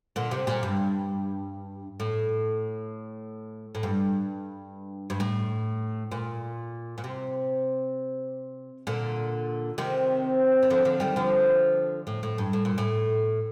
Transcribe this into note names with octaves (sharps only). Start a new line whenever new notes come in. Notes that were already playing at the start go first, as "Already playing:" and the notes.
A#2 D3
C3
A#2
G2
A2
A2
G2
G2
A2
A#2
A#2
C3
A#2 D3
C3 D#3
D#3
D3 F3
D3 F3
D#3 G3
D3 F3
A2
A2
G2
A2
A#2
A2